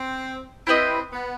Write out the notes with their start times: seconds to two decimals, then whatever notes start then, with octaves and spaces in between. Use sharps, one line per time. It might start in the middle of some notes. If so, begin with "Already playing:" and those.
Already playing: C4
0.67 C4 E4 G4 B4 D#5
1.12 B3